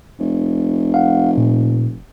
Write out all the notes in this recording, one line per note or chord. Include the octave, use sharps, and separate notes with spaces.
F1
F5 F#5
A#2